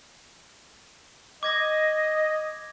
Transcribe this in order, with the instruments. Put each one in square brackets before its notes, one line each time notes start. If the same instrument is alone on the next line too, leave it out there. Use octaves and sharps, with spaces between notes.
[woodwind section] D#5 [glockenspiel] D6 G#6 A#6